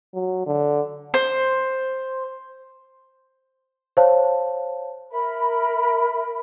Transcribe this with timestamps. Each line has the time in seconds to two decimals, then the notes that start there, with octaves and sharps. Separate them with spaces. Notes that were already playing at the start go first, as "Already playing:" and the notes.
0.14 F#3
0.46 D3
1.14 C5
3.97 C5 C#5 F5 A5
5.10 A#4 E5 B5